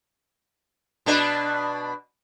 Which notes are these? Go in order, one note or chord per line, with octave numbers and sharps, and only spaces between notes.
B2 D4 B4